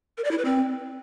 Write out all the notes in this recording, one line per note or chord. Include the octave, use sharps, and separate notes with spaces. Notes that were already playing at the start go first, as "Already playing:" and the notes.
A#4
D5
E4
B4
C4